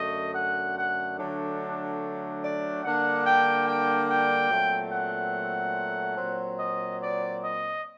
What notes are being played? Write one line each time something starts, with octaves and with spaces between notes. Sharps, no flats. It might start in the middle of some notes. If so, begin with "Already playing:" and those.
Already playing: F#2 D3 A3 D#5
F#5
F#5
D3 F#3 A3 D4
D5
D3 G3 A#3 D4 F#5
G5
G5
G5
A#2 F#3 A3 C4
F#5
A#2 F#3 C4
D#5
D5
D#5